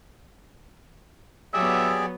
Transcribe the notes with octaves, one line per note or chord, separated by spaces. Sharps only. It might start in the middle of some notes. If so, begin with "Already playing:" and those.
F#3 B3 G4 G#4 D5 E5